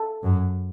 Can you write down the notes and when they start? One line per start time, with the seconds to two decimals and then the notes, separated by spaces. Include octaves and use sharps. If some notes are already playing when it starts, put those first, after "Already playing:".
Already playing: A4
0.23 F#2